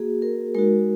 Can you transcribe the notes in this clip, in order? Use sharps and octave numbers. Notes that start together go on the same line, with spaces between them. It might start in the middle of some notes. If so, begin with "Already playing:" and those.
Already playing: A#3 F#4 G#4
A#4
G#3 D#4 F#4 A#4